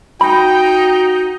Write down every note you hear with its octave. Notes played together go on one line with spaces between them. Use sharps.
D#4 F#4 G5 B5